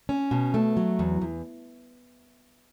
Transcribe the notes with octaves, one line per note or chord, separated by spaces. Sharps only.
C#4
B2
A3
F#3
E2
E2